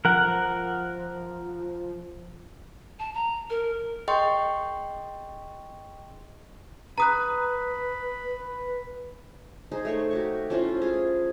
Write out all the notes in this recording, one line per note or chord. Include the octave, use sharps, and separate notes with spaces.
F3 A#4 F#5
A5
A#5
A#4
G#4 D#5 G5 C6 C#6
B4 A#5 B5 D#6 F#6
D#4 G#4 C5
A3 C#5 C#6
F#4 G4 C#6
F3 C#4 E4 F4
F4 G#4